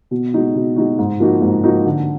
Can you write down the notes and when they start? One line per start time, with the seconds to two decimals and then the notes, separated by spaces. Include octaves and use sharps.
0.11 B2
0.33 G#3 D#4 F#4
0.55 B2
0.76 G#3 D#4 F#4
0.99 G#2
1.20 F3 A#3 D#4 F#4
1.42 G#2
1.64 F3 A#3 D#4 F#4
1.85 D3